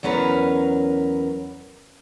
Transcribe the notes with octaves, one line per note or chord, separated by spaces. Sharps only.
E2 F#3 C#4 A#4 B4